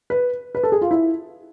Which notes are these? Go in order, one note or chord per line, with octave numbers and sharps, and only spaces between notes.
B4
B4
A4
G#4
F4
E4